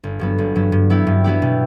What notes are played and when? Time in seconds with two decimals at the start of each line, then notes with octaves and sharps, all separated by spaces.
0.04 G1
0.19 G2 F#3 B3
0.38 G1
0.55 G2 F#3 B3
0.72 G2
0.90 F#3 B3 E4 G4
1.07 G2
1.24 F#3 B3 E4 G4
1.42 B2